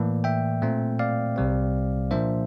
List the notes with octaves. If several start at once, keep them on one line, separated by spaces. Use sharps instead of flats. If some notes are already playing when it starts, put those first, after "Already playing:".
Already playing: A2 E3 A#3 D5
E5 G5
A#2 A3 C4
D5 F5
C2 C3 G3 C4
A#2 F3 A#3 D4 C5 E5